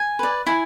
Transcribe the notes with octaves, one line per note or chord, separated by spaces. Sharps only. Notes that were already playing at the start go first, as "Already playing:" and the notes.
Already playing: G#5
B4 D5
E4 G#5